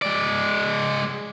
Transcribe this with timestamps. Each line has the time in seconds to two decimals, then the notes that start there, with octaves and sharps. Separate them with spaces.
0.02 G#3 D5